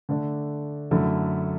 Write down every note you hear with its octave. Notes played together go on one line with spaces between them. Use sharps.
D3 A3 D4
F#2 D3 A3 E4